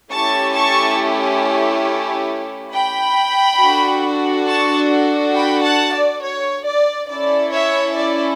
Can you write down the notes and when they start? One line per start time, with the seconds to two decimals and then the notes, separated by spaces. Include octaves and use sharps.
0.11 A3 C#4 E4 G4 A5 C#6
0.54 A5 C#6
2.73 G5 B5
3.61 D4 F#4 A4
4.48 A5 C#6
5.35 G5 B5
5.64 F#5 A5
5.94 D5
6.23 C#5
6.67 D5
7.10 C#4 E4 A4 D5
7.53 C#5 E5
7.97 D5